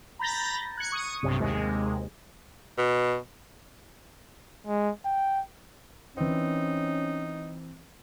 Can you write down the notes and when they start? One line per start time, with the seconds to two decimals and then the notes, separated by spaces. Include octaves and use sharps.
0.19 A#5 B5 G6 A6 A#6
0.77 F#6 G#6 C#7
0.92 C#6 D#6
1.22 B1 G2 C3
1.40 D#2 C3 G#3
2.78 B2
4.67 G#3
5.05 G5
6.17 E3 C4 C#4 D#4